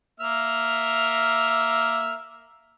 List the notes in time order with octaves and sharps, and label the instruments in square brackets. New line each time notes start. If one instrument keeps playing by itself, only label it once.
[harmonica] A#3 E5 F6